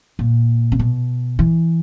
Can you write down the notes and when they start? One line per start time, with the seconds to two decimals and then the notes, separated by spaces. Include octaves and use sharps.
0.19 A#2
0.72 C#3
0.79 B2
1.39 E3